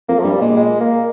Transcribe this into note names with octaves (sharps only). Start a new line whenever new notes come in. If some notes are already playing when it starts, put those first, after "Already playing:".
F2 A#3
F3
G2 G3
A#2 G#3
G#3
A#3